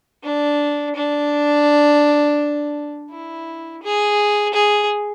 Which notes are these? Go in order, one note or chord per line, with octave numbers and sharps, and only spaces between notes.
D4
D4
E4
G#4
G#4